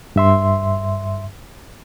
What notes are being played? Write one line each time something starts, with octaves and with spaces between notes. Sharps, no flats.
G2 E5 C6